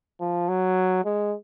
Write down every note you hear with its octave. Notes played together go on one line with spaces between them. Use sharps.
F3
F#3
G#3